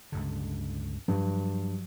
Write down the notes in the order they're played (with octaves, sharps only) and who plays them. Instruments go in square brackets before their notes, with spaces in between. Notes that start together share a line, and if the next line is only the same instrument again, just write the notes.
[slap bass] C#2 G2 D3
[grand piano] G2 [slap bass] F3 F#3